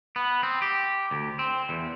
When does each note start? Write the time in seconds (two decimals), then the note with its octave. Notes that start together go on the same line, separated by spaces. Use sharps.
0.16 B3
0.43 C4
0.62 G4
1.11 D2
1.39 C4
1.69 E2